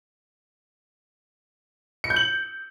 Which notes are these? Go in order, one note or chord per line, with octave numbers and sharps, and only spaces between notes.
C#7
G6
F#7